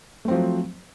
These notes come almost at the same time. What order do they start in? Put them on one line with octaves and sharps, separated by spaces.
A3 C4 F3 F#3